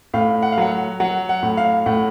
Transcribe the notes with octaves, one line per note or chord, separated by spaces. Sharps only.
A2 F5
F#5
F5
F#3 F#5
F#3 F#5
F#5
A2
F5
A2 F#5